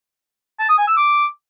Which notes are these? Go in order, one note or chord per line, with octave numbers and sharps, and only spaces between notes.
A5
D#6
G#5
E6
D6